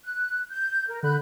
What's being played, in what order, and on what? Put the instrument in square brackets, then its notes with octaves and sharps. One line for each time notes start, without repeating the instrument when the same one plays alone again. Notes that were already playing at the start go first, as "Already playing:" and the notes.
[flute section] F#6
G6
A#4
[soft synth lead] D3 [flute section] B5 F#6 G6